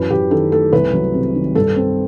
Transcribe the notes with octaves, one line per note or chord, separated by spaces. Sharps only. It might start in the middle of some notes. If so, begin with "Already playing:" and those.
Already playing: F#2 E3 B4
F#2 G4
D#3 A4
A3 A4
C2 B4
F#3
C3
D#3
G2 A4
C4